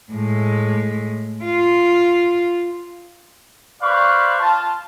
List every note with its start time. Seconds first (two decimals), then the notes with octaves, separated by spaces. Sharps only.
0.12 A2 G#3
1.45 F4
3.82 B4 C5 D5 F5 B5 C#6
4.40 F4 A5